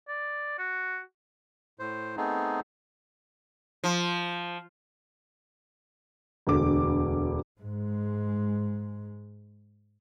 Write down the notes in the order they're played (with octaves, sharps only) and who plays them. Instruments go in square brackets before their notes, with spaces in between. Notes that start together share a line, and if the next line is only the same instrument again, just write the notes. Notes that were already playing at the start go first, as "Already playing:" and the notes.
[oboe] D5
F#4
[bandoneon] A2 C5
A3 B3 C4 D#4 G#4
[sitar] F3
[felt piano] E1 D2 D6
[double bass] G#2 G#3